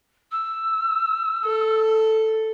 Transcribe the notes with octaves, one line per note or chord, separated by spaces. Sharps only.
E6
A4